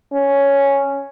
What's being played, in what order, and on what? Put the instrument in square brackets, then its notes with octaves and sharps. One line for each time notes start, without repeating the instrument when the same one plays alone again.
[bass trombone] C#4